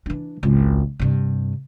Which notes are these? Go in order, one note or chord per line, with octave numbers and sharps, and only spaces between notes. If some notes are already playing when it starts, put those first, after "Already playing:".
E3 D4
G#1 C#2
G2 C3